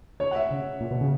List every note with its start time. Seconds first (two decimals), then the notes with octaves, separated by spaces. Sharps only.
0.20 C#3 C#5
0.31 F#5
0.35 E5
0.51 C#3
0.81 A#2
0.91 B2
1.01 C#3